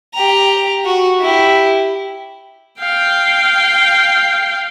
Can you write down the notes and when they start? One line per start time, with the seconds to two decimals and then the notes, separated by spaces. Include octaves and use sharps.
0.14 G4 A#5
0.85 F#4
1.20 E4 G4
2.80 F5 G5